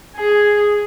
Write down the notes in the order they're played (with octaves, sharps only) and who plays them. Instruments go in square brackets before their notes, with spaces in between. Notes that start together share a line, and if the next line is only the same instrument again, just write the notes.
[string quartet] G#4